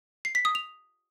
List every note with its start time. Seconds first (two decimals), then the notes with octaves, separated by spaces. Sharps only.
0.25 C7
0.35 B6
0.45 D#6
0.55 F7